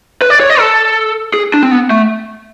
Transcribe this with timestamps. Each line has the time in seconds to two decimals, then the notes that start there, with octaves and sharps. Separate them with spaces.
0.22 B4
0.30 D5
0.40 C#5
0.50 D#5
0.59 A4
1.34 G#4
1.54 D4
1.63 C4
1.71 B3
1.91 A3